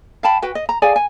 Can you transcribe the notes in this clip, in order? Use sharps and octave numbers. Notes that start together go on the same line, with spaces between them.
F5 G5 A5 B5
F#4 B4 G5
D#5
A#5
G#4 D5 F5 G#5
G#5